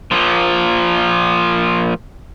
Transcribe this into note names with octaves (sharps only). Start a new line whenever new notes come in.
A#2 F3